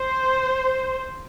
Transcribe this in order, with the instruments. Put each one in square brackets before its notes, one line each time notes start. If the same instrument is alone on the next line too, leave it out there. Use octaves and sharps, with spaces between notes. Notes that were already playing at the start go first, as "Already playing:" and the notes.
Already playing: [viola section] C5